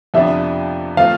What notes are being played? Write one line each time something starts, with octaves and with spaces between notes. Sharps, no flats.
F2 C3 F3 B3 D4 E5
F3 A3 C4 F4 F5